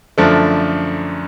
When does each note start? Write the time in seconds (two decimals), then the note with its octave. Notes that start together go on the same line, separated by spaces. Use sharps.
0.18 F#2 D3 F3 A3 D4